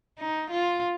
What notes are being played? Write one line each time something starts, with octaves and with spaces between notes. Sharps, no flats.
D#4
F4